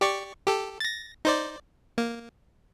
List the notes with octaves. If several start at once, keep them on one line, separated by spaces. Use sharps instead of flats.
G4 D5 C#6
G4 A4
A6 A#6
D#4 C5 D5
A#3